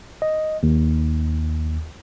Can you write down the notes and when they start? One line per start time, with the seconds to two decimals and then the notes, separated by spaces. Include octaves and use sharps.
0.22 D#5
0.63 D#2